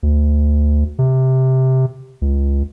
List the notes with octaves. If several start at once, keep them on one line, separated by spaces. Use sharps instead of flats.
D2
C3
C#2